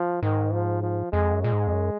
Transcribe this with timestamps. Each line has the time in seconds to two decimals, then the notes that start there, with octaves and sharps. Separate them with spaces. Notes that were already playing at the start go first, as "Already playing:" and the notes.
Already playing: F3
0.23 G#2 D#3
0.53 F3
0.83 F3
1.12 F2 G#3
1.33 F#2
1.43 A#2 G#3
1.53 G#2
1.67 F2
1.73 F#2